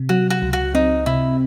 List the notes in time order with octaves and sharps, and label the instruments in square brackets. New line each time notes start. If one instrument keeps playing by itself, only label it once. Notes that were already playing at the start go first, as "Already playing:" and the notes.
Already playing: [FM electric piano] C3
[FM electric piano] F#3 [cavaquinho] F#4
[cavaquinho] F#4
[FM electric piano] C#2
[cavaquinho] F#4
[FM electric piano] C4 [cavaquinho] D#4
[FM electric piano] C3 [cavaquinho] E4